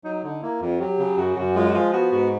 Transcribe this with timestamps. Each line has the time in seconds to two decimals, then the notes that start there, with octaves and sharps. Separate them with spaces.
0.04 F#3 D#4
0.23 D3 D#4
0.42 A#3 E4
0.61 F2 F4
0.80 F#3 G4
0.99 C#3 G4
1.17 F#2 F#4
1.36 F#2 F#4
1.55 G#3 F4
1.68 F#4
1.74 F3 F4
1.93 B3 F#4
2.12 G#2 F#4